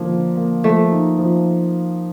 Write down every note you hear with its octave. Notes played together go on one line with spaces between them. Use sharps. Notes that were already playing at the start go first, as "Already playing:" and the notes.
Already playing: D3 F3 A#3
D3
A#3
F3 A3
D#4
F3